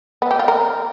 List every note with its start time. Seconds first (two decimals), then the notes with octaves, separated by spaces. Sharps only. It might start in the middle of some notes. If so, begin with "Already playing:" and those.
0.22 B3
0.31 G4
0.39 F4
0.48 A#4